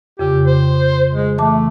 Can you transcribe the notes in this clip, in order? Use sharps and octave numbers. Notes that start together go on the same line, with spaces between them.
F2 C#3 G4
C5
G#3
E3 A3 A5 D6